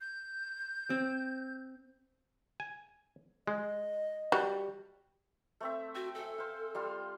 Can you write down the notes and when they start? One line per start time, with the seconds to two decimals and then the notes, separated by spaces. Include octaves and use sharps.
0.01 G6
0.90 C4
2.60 G#5
3.47 G#3 D#5
4.32 G3 F#4
5.60 A3 C4 E5
5.95 F#4 G5
6.15 A4 E5 G#5
6.38 C5 F5
6.75 G3 F4 C6